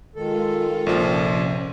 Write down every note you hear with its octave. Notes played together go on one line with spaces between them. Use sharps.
D#3 G#3 F4 A4
A#1 C3 F3 C#4